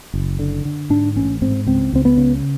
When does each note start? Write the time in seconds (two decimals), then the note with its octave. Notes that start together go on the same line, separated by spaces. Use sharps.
0.14 F#1
0.39 D3
0.65 D3
0.90 G#2 D4
1.16 A1 C#4
1.42 G#2 C4
1.67 C#2 C4
1.92 C#2 C4
2.05 B3
2.17 C#3